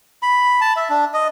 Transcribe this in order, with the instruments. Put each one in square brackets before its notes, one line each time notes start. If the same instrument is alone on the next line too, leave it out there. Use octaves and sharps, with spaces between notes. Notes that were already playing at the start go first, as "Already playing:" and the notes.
[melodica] B5
A5
E5
D4
D#5